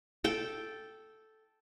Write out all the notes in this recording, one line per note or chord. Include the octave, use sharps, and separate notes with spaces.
A4 G5